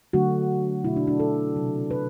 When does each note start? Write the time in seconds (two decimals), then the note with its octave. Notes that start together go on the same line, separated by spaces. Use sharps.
0.13 D3 F#3 A3 F#4
0.84 B2 A3 E4
0.96 D4
1.07 D4
1.20 A4
1.56 C3 F#3 A3
1.91 B4